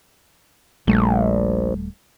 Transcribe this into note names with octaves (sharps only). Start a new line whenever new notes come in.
D#1 A#1 G3 A3